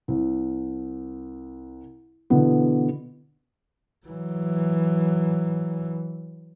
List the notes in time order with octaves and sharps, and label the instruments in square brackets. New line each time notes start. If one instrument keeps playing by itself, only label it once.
[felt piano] C2
B2 D3 E3 B3
[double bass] E3 F#3